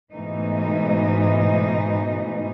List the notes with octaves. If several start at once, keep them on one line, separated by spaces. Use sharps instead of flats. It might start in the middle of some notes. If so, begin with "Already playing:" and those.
G#2 B2 E3 A3 D#4